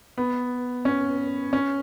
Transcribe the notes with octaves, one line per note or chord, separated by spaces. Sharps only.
B3
C#4
C#4